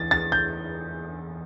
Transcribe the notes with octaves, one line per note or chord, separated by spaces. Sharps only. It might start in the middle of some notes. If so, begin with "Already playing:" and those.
Already playing: E2 A6
A6
G6